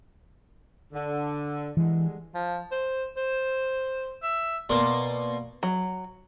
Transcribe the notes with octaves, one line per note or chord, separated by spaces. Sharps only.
D3
D3 E3 G3 G#3
F3
C5
C5
E5
B2 A#3 A#4 D5 C6 D6
F#3